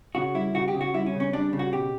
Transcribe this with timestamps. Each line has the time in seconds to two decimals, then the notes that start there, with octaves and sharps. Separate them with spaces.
0.15 C#3 F#4
0.34 G3 E4
0.54 C#3 F#4
0.68 G4
0.74 C#3
0.81 F#4
0.94 G3 E4
1.06 C#4
1.13 C#3
1.20 C#4
1.33 G3 D4
1.53 C#3
1.59 F#4
1.72 B2 G4